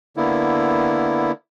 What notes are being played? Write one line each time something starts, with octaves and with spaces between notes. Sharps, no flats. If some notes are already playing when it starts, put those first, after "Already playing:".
D3 A#3 B3 E4